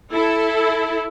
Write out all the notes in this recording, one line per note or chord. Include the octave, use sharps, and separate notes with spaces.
E4 A4